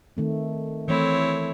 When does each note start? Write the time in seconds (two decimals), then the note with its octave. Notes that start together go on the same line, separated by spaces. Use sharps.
0.17 D#3 A3 C4
0.88 E3 A3 C4 E4 C#5